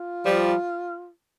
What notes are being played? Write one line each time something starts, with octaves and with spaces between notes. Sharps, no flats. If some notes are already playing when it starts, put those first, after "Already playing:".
Already playing: F4
F3 G3